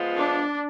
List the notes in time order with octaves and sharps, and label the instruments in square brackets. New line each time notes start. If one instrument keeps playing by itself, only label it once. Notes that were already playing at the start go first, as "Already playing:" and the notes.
Already playing: [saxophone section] F3 G#3 B3 F4
[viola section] D4